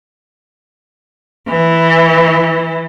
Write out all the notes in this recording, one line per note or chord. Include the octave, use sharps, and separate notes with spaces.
E3